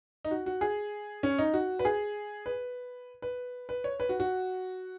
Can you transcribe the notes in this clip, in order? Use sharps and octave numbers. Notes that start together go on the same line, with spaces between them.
D#4
F#4
F#4
G#4
C#4
D#4
F#4
B4
G#4
B4
B4
B4
C#5
B4
F#4
F#4